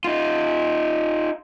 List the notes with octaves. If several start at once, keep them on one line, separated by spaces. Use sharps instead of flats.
D#4 F4